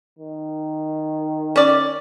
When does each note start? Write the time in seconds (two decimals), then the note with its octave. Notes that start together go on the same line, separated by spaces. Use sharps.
0.19 D#3
1.56 C#4 D5